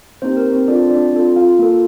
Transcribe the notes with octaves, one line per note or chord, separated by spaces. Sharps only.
A#3 C4 D#4 G4 C5
A#4
C4 C5
C4 D4 F4 A4 D5
D4 D5
C4 F4 A4
F4 F5
A#3 F4 A4